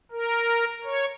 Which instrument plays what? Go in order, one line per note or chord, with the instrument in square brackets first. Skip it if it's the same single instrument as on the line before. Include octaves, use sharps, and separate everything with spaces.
[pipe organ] A#4
C#5